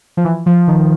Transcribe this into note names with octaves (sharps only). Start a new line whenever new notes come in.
F3
E3
F3
D#3